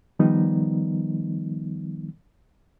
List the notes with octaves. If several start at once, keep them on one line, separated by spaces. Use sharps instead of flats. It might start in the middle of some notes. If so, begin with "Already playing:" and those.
D#3 F3 G3 B3 D#4